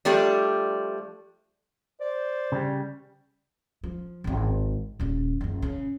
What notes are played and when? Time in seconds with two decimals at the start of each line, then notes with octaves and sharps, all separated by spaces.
0.05 F3 G3 A3 D4
2.01 C5 D5
2.52 C#3 G3
3.84 F3
4.24 D#1 G#1
5.00 D#1 C#3
5.41 F#1 C#2
5.62 C#3